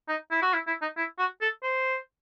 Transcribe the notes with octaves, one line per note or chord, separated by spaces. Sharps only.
D#4
E4
F#4
E4
E4
D#4
E4
F#4
A4
C5